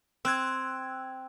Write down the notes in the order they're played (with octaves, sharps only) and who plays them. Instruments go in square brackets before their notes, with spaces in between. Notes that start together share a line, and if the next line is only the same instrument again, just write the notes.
[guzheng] C4 [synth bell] E6 F#6 G#6